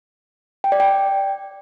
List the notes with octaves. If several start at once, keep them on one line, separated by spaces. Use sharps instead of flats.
G5
D5
G5